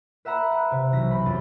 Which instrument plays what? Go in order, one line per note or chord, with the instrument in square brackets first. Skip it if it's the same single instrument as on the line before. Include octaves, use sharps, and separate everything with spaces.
[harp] B4 E5 F#5 A#5 B5
F#5
C3
B1 E3 A#6 B6
C4 B5
F#2 F4 G4 A6